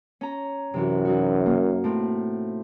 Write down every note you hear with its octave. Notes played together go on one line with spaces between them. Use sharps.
C#4 A#5
F#2 C3 E3 F#4
E3 D#4 F#4
A#3
A2 C4